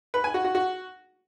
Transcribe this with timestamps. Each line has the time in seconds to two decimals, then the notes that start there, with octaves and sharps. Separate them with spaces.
0.14 B4
0.24 G#5
0.34 F#4
0.44 F#4
0.55 F#4